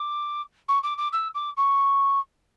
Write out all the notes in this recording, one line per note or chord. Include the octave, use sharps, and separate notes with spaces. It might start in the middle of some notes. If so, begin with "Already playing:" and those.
Already playing: D6
C#6
D6
D6
E6
D6
C#6